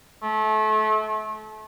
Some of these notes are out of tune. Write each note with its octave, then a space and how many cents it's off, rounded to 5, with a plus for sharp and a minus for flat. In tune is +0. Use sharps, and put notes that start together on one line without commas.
A3 -30